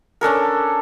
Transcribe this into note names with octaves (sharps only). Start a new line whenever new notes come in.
C#4 D4 A4 A#4